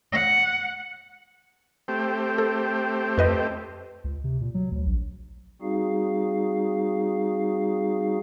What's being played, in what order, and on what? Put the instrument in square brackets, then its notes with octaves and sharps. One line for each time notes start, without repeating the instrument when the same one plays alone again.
[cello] F#5
[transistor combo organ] A3 C4 G4
[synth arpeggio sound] A4
F2 B4 D#5
[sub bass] C#2
C3
A#2
F#3
D2
A#1
[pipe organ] G3 C4 D#4 F#4 G#4 F5